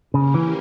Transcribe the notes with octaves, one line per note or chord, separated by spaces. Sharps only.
C#3 A#3 C#4 G4 A#4
E3